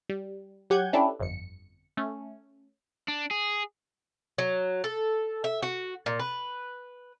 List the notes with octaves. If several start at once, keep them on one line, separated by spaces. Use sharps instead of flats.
G3
F#3 G4 F#5 G#5 G6 G#6
C#4 D4 E4 G4 A4 B4
G1 F2 C#7
A3 C#4
D4
G#4
F#3
A4
E5
F#4
A#2
B4